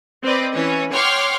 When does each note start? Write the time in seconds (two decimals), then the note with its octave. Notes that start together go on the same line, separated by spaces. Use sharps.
0.23 C4 B4 D5 D#5
0.53 E3 C#4
0.92 C#5 F#5 G5 C6 D6 F6